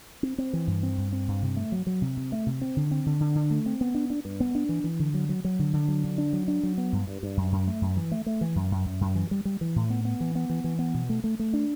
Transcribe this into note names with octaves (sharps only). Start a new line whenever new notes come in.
C4
C4
E3
G2
C4
G2
C4
G2
C3
A3
F#3
F#3
C3
C3
A3
C3
C4
D3
C4
D3
D3
D3
A3
C4
B3
D4
D4
G2
B3
D4
E3
E3
D3
F#3
F#3
F#3
D3
D3
F#3
D3
D4
F#3
D4
F#3
B3
G2
G2
G2
F#2
F#2
A3
F#2
E3
A3
A3
E3
F#2
F#2
F#2
F#2
E3
G3
G3
E3
A2
B3
B3
E3
B3
E3
E3
B3
B2
A3
A3
A3
D4